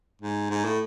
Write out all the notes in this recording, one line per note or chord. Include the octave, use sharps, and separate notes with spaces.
G#2
G#2
A2